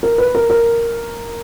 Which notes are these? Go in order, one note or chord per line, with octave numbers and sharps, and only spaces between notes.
A#4
B4
A#4
A#4